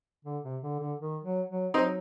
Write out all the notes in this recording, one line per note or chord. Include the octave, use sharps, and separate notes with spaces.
D3
C3
D3
D3
D#3
F#3
F#3
F#3 C4 D#4